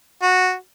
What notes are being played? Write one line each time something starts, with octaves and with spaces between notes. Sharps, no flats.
F#4